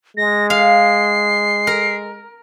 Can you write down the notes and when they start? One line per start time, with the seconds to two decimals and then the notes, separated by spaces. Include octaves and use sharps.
0.17 G#3 A#6
0.50 F5 C7
1.67 A#4